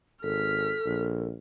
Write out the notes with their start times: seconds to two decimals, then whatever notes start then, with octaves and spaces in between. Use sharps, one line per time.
0.23 G#1 A4 F6 B6
0.85 A#1